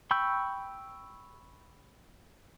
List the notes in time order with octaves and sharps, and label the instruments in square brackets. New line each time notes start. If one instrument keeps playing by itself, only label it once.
[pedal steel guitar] G5 B5 C#6 E6 G6